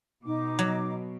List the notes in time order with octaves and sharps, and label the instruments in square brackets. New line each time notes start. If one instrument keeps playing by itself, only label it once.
[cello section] B2 [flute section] D#4 D6
[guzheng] F#3